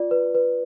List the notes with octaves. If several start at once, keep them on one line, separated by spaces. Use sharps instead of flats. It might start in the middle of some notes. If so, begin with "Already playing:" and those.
Already playing: F4 D5
B4
B4